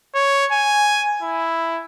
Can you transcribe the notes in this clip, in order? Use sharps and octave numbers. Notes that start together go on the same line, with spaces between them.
C#5
G#5
E4